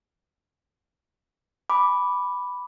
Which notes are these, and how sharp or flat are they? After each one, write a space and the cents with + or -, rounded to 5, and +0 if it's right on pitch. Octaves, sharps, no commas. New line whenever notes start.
G#5 +0 B5 +0 D6 -5